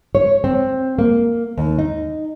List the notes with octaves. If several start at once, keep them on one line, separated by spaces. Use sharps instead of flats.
C#5
C4
A#3
D#2
D#4